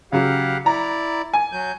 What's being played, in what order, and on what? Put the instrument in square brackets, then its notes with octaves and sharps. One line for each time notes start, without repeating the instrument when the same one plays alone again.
[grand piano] C#3 F#3 [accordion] G4 F5 F#5
[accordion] E4 D5 [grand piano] A#5
[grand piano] G#5
[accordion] F#3 G6